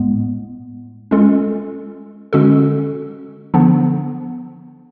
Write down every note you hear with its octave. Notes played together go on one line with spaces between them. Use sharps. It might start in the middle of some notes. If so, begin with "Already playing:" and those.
Already playing: A2 G#3 B3
G#3 C#4 F4 A4
D3 G#3 C#4 F#4 A4
D3 F3 B3 D4